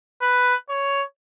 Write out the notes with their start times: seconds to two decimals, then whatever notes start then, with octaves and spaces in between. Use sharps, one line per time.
0.21 B4
0.69 C#5